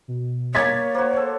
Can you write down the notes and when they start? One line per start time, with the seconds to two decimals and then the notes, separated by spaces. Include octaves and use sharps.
0.08 B2
0.55 A#3 C#5 G#6 A6 B6
0.95 A#3 F#4 C5
1.17 A4